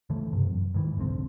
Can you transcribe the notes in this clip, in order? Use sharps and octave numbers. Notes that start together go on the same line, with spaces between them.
C#3 E3 A3
G2 C3
F#2
G#2 D#3 E3
F1 C2 D3 C4